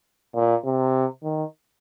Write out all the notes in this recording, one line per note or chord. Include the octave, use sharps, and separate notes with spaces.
A#2
C3
D#3